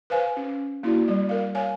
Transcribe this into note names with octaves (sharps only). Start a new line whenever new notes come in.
B4 C5 F5 G#5
C#4
A#3 E4 F#4 D5
G3 D5
A#4 F5
C#5 F5 G#5